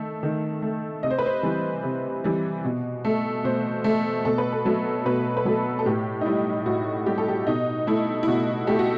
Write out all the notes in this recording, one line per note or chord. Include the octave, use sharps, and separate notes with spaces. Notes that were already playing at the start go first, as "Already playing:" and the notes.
Already playing: D#3 A3
D#3
A3
C3 D#5
C5
B4
C5
E3 G3
C3
E3 G3
B2
A3
B2 C5
A3
B2 A4
B4
A4
F#3 A3
B2 B4
B4
F#3 A3 A4
A4
A2 G4
D#4
G3 E4
A2 F#4
G3 G4
A4
G4
B2 D#4
A3 E4
E4
B2 F#4
A3 G4
F#4